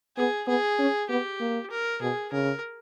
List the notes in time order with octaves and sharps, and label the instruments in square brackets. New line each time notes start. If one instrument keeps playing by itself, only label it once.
[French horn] B3 [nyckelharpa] G#4
[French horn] B3 [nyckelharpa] G#4
[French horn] C#4
[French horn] B3 [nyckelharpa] G4
[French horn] A#3
[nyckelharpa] A#4
[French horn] B2 [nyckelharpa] G#4
[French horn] C#3 [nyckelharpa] A#4